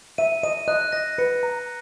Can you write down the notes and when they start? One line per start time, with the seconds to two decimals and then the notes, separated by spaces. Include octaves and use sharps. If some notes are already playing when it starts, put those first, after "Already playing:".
0.18 E5 D#7
0.43 D#5 D#7
0.68 D#5 F#6
0.92 D#5 A#6
1.18 B4 C#7
1.43 A#5